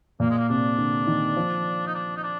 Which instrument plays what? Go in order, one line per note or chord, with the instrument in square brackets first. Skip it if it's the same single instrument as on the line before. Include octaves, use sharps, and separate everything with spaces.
[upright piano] A#2 [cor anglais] A#3
[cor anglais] G#3
A#3
[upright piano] C3 [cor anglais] D4
[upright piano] D3
D#3
F3
[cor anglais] D#4
D4
D#4
D4